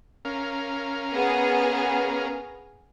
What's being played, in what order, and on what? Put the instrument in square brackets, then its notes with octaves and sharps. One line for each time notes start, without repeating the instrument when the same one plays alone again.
[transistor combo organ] C#4 A#4 F5
[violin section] B3 G#4